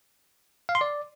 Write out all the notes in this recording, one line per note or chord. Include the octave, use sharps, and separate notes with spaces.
F5
C6
D5